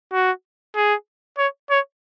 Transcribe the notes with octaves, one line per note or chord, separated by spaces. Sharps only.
F#4
G#4
C#5
C#5